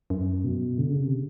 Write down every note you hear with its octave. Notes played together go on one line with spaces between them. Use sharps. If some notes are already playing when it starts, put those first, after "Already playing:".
F#2
B2
D3
C#3
C3